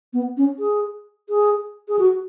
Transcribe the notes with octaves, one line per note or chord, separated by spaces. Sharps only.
B3
C#4
G#4
G#4
G#4
F#4